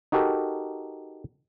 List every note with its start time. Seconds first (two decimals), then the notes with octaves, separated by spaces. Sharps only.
0.12 D#4 F#4 G4 A4 A#4